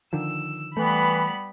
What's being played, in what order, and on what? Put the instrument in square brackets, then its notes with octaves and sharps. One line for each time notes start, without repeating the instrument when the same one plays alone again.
[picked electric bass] D3 D#3 F3 [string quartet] E6
[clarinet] E3 [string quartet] G3 B3 [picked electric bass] A3 [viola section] B5